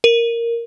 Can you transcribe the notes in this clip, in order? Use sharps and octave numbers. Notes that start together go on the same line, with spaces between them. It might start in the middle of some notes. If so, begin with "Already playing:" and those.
A#4